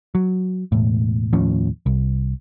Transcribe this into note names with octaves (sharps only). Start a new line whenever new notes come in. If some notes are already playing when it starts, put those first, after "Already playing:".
F#3
E1 A2
D#2 A2 F3 C#4
C2